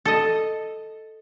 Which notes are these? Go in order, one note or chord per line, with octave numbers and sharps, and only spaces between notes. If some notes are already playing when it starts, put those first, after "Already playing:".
A4 D#5